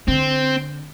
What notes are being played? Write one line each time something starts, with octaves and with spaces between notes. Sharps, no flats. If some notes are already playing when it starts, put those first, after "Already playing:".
D3 C4